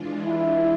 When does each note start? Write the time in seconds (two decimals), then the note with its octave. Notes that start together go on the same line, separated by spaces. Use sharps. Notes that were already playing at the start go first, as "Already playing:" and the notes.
Already playing: E3 G#3 D4 F4
0.26 E4